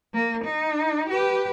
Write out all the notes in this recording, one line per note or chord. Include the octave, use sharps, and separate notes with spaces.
A#3
D#4
G4 B4